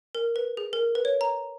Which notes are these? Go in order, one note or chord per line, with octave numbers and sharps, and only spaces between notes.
A#4
B4
G#4
A#4
B4
C#5
A#5